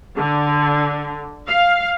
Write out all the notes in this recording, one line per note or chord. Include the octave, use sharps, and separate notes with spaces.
D3
F5